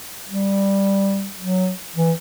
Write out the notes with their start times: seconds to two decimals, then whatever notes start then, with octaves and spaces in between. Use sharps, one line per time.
0.29 G3
1.40 F#3
1.96 E3